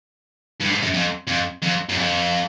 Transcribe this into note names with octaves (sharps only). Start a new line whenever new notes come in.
G2
G#2
F#2
F2
F2
F2
F#2
F2